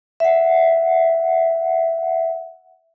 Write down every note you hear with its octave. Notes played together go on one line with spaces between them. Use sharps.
E5 F#5